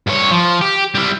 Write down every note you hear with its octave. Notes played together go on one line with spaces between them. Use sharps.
G2 C#5
F3
G4
G3 E4